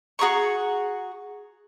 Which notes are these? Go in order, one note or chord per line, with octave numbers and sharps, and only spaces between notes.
F#4 G#4 A#5 C#6